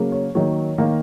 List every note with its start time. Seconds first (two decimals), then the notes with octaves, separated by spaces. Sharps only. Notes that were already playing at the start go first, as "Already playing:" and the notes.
Already playing: C#3 F#3 A#3
0.12 C#5
0.35 D#3 F#3 A#3 C#5
0.78 D#3 A#3